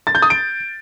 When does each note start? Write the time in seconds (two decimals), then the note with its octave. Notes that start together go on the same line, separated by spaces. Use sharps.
0.07 A6
0.15 G6
0.22 D#6
0.30 D7